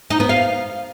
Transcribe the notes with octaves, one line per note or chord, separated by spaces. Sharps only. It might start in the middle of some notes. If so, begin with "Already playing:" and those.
D#4
B3
F5